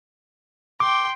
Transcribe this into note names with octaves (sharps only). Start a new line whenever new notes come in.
G5 C6 D6